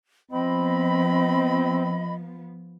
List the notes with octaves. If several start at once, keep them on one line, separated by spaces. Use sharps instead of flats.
F3 B3 C4 D#5 B5